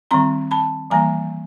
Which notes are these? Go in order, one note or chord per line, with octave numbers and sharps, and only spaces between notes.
D#3 G3 C4 A#5 C6
A5 B5
E3 G3 A#3 G#5 A#5